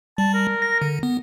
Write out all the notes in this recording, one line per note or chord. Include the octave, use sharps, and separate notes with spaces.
G3 A5
A#4
A#6
D3
B3